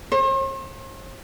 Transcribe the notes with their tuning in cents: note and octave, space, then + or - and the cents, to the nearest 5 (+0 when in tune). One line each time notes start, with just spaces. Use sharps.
C5 +45